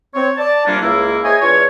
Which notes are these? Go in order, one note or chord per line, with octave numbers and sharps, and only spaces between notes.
C4 C#5
D5 A5
C3 F3 G3 A#3 C#4 D4
C#2 A#3 E4
E4 G#4 C5 C#5 D#5 G#5
E2 D4 F4 C#5